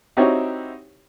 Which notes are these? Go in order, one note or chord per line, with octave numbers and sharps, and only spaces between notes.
C4 D#4 E4 F#4 G4 C#5